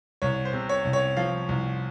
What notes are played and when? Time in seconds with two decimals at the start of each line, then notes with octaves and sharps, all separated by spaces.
0.22 C2 C#5
0.45 C5
0.53 C3
0.69 C#5
0.85 C2
0.93 C#5
1.17 F3 F5
1.49 C2